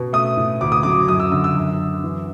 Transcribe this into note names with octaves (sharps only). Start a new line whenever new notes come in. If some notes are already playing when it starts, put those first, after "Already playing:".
Already playing: B2
A3 D#6
A2
D2 D6
D#6
F#3 D6
F#2 D#6
E6
D3 E6
E6
F#2
F#2
E3